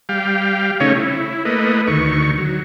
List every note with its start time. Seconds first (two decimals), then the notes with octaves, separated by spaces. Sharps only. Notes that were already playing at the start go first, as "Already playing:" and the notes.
0.09 G3 F5 G5
0.80 C#3 A3 C#4 D#4 C#5
0.95 E4
1.45 A3 A#3 B4 D#5
1.87 D2 D#3 C#6
2.38 F#3